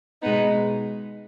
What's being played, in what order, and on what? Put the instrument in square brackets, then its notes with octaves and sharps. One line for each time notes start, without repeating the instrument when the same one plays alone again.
[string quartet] B2 G#3 B3 D#4